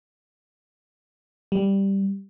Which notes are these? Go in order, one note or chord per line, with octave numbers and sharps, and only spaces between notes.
G3